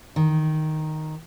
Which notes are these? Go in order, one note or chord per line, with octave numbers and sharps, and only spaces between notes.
D#3